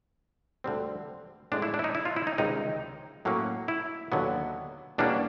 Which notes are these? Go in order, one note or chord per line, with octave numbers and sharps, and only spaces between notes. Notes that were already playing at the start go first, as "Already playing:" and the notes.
D2 D3 G3 C4
A2 F3 G#3 C#4 D4
E4
D4
E4
D#4
E4
F4
E4
D#4
C#2 C3 D#3 G3 D#4
A2 F#3 A#3 C#4
E4
D#2 D3 F#3 B3
E2 B2 G3 A#3 C#4 D4